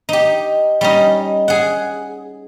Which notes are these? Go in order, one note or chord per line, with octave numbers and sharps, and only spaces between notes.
D#4 G4
G3 C#4 D#4
G#4 F#5